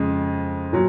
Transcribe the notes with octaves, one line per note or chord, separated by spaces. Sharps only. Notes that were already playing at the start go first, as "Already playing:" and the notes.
Already playing: F2 C#3 G#3
A#2 F#3